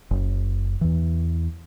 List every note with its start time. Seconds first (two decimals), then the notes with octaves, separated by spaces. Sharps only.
0.11 F#1
0.81 E2 E3